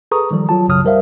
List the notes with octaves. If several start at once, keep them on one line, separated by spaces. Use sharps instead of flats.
G#4 A4 B4 A#5 C#6 D#6
D#3 F3 G3 A4
F#3 F4 A5
B1 F#2 C#3 F#3 D#6 F6
G3 A#4 C5 E5 F5